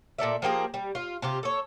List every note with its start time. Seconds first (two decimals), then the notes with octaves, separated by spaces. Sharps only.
0.18 A#2 A4 D5 E5
0.42 F3 A#3 G4 G#4
0.74 G3
0.95 F4
1.22 C3 F4 G4
1.43 A4 C#5